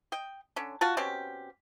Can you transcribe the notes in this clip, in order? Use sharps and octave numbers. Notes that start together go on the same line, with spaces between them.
D#5 G5
D3 C#4
F4 F#4 A5
B2 C4 C#4 G4